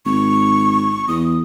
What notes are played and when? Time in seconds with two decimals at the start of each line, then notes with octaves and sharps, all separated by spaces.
0.06 G#1 C#6
1.08 E2 D#6